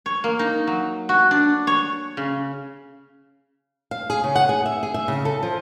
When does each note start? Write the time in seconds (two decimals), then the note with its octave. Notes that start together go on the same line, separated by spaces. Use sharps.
0.06 C#5
0.24 A#3
0.39 D#4
0.67 F#3
1.09 F#4
1.31 D4
1.67 C#5
2.17 C#3
3.91 F5
4.10 G#4
4.24 C#3
4.35 F#5
4.49 G#4
4.66 E5
4.83 G#4
4.94 E5
5.08 C#3
5.25 A4
5.43 F3